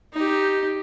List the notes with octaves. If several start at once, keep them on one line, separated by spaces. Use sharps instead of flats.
D#4 G4